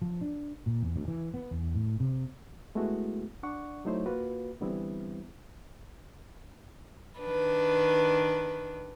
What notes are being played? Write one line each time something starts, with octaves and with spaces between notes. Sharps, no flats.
F3
D4
A#2
E2
D2
E3
B3
E2
A2
C3
G#3 A3 B3 E4 F#4
D4 D5 F#5 C#6
F#3 A3 D#4 E4 C5 C#5
A#3 F4 F#4 B4
D3 E3 G3 B3 C4 E4
D#3 D4 B4